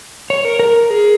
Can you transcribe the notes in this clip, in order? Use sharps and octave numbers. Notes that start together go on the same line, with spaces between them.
C#5
A#4
A#4
G#4